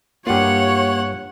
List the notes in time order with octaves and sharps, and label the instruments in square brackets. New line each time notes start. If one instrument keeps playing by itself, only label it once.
[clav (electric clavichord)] G2 F4 [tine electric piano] A#3 G4 [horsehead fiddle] C#5 [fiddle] F#5